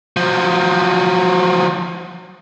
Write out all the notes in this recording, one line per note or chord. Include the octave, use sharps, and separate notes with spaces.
F3 F#3